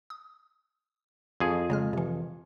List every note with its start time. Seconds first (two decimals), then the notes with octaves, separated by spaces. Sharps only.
0.10 D#6
1.40 F2 G#4
1.70 C#3 G#3 F6
1.93 C3 E3